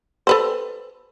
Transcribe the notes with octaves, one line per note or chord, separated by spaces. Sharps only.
A4 B4 C5